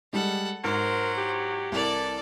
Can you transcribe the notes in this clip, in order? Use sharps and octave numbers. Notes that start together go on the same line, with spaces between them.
G3 G#3 A4 F#5
G#2 F#3 A#4 C5
G4
C2 E3 A4 A#4 D5 F7